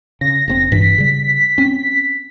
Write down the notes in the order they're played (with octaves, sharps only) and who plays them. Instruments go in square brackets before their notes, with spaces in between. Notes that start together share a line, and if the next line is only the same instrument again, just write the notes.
[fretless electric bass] C#3 [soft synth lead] A#6
[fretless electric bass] F1 A#2 C4
[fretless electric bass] G2 A#2 E3 [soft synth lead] B6
[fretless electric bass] C#3 G3
C4 C#4